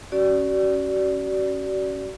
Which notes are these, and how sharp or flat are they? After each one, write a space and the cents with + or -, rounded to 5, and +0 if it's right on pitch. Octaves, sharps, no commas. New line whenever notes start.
C#4 +0 F#4 +40 D5 -15